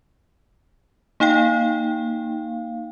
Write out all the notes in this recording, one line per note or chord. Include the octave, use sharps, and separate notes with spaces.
A#3 D#4 F5 G5